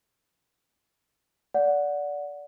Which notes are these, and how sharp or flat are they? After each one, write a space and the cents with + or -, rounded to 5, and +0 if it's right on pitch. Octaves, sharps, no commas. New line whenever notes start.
D5 -15 F#5 -10